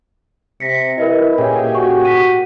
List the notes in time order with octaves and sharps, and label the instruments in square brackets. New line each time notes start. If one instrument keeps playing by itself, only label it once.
[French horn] C3 [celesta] A#6 B6 C#7
[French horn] E4 [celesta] A#4 B4 D#5
[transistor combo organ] A#2 G4 G#4 [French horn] C#4
[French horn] F#4 [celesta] C#6
[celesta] B6 D#7